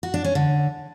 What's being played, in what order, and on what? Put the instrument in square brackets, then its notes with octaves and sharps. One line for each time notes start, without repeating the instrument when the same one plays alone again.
[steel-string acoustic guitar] F#4
D4
C#4
D3